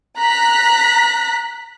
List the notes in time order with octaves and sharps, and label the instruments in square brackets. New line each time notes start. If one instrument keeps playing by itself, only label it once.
[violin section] A#5 F#6 B6